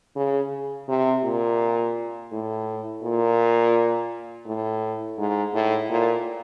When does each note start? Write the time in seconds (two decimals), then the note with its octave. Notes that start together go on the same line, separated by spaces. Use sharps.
0.16 C#3
0.89 C3
1.24 A#2
2.32 A2
3.03 A#2
4.46 A2
5.18 G#2
5.54 A2
5.90 A#2